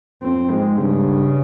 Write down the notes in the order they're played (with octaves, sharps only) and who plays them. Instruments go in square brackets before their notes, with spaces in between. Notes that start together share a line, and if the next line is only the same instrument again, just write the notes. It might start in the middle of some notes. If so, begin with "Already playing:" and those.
[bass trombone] F2 [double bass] C4
[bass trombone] G#2 [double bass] G#3
[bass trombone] G2 [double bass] C#3